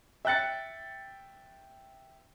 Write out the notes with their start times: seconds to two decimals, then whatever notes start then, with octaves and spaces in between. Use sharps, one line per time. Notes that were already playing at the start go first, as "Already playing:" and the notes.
0.25 E5 G5 F#6 A6 C#7